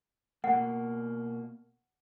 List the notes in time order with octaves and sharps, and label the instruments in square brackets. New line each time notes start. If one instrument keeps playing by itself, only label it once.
[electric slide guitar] B2 A#3 [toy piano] F#5